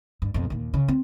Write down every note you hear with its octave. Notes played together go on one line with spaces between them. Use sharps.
G2
F2 B2
D#2 A#2
C#3
C4